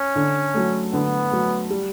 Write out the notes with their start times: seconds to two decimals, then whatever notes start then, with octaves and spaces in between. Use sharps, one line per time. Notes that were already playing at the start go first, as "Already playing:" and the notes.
Already playing: C#4
0.16 D3
0.54 F#3 A3
0.92 D3 B3
1.31 F#3 A3
1.70 G3